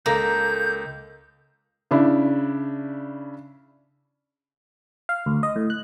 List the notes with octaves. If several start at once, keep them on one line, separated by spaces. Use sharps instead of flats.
C#2 A#3 A4 G6
C#3 D4 E4
F5
D2
D#5
A2
F#6